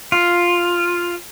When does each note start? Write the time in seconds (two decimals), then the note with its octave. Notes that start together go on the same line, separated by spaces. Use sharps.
0.12 F4